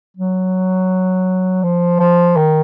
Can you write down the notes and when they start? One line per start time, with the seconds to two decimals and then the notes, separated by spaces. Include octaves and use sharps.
0.17 F#3
1.63 F3
2.00 F3
2.37 D#3